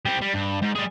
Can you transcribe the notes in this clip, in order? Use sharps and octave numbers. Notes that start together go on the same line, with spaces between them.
G3 C4
G3
G2
G#2
G3 G#4